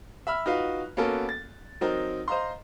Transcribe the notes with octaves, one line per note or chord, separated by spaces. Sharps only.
E5 B5 E6 F6
D#4 F4 F#4 B4 F5
A#3 B3 C#4 F#4 A4 A#4
A6
F#3 C4 D#4 A#4
C5 D#5 F5 A#5 C6